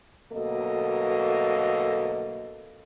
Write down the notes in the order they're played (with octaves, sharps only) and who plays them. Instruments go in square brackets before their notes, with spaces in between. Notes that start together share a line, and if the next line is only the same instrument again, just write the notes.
[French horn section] D2 B2 F#3 A#3 A4 D#5